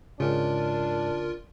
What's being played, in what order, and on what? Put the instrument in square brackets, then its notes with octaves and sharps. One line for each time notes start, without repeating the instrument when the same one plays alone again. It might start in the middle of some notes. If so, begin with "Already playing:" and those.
[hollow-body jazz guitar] G#2 [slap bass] C#3 [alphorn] D4 [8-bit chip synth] F4 A#4